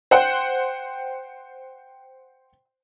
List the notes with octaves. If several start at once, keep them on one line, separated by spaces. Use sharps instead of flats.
C5 F#5 G5